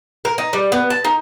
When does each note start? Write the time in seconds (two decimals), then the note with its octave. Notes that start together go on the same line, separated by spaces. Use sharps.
0.25 A#4
0.38 D#4
0.53 G3
0.72 B3
0.90 A5
1.05 D#4